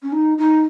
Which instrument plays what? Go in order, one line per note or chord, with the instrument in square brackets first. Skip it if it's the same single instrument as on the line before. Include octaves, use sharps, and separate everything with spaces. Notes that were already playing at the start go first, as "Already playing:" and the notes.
[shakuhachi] C#4
D#4
D#4